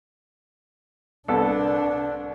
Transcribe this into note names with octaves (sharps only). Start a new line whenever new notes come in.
C2 B3 D4 A4